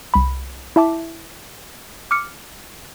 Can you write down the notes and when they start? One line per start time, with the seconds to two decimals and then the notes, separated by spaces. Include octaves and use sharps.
0.14 C2 B5
0.76 E4 E5 A5 D6
2.11 D6 F6 C#7